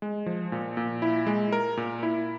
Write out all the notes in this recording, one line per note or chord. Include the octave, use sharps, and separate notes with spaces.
G#3
F3
A#2
A#2
E4
G#3
A#4
A#2
E4